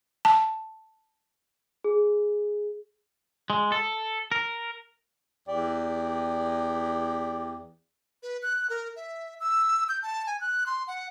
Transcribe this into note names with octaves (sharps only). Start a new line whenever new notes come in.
A5
G#4
G#3
A4
A#4
E2 G4 D5
B4
F#6
A#4
E5
E6
G6
A5
G#5
F#6
C6
F#5